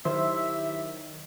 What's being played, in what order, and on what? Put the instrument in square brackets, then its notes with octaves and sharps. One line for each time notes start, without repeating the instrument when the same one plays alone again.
[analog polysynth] D#3 F#3 [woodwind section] E4 G4 E5 [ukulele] C5